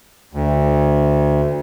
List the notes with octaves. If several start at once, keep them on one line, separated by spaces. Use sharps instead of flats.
D2